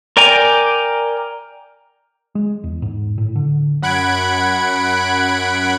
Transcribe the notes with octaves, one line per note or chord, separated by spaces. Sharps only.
A#4 D5 G5 G#5 A#5
G#3
E2
G#2
A2
D3
F#2 F#5 B5 F#6 G#6 D7